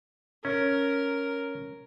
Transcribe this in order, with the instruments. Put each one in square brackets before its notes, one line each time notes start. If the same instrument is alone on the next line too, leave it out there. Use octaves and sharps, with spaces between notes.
[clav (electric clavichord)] C#4 [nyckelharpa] A#4